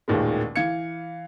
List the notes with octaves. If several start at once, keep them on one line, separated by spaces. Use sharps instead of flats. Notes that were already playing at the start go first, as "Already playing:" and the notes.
A1 D#2 A#2 D#3 G#3
E3 F5 G#6 C#7